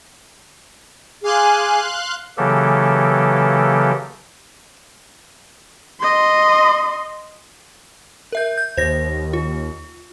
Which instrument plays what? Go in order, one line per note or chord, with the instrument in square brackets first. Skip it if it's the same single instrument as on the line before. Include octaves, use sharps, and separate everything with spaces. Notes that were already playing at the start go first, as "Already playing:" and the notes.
[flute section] G#4 G#5 D6 [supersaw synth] F5 C6 F#6
[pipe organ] C#3 E3 F#3 A#3 G4 A4
[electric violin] D#5 C6
[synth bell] A#4 E5 G6
G6
[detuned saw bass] D#2 [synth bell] C5 A#6
[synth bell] F4